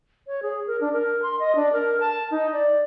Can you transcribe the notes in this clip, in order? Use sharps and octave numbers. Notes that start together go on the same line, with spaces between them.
C#5
G#4
A#4
D4
A#4
C6
D#5
D4
A#4
A5
D#4
D5